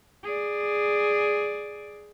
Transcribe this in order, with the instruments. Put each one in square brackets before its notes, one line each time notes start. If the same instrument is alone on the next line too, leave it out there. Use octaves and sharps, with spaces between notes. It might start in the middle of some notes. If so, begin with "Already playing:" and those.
[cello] G#4 D5